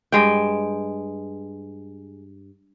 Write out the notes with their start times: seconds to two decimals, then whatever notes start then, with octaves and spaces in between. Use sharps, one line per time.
0.12 G2 G#3 G5